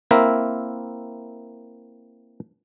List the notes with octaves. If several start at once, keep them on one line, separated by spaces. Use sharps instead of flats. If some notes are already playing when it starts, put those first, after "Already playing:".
A#3 C4 E4 A#4 E5